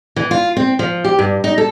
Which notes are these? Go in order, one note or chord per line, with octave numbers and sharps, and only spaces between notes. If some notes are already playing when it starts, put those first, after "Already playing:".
E3
F4
C4
F3
G4
G2
D#4
A4